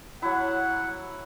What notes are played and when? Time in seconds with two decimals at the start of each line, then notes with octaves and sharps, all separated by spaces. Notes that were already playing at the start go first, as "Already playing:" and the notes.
0.22 F#3 E4 F#5